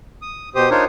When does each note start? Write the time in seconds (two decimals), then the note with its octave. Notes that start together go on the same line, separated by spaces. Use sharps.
0.22 D#6
0.55 B2 G4 C5 D#6
0.70 D4 D#4 F4 A#4 C5 C#5